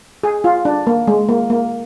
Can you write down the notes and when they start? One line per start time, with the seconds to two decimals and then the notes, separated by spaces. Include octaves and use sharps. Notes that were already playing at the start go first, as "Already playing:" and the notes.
0.23 G#4
0.44 F4
0.65 D4
0.87 A#3
1.07 G#3
1.29 A#3
1.50 A#3